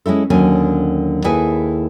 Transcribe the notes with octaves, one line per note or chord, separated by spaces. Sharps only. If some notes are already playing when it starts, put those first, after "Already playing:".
G#3 C#4 E4 A4
D#2 D3 F#3 C#4 G#5
D#2 E4 G#4 A4 B4 G#5